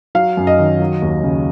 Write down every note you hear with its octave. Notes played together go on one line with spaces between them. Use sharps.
F#3 F5
F#2
D#5
D#3
F#3
D#2
C#3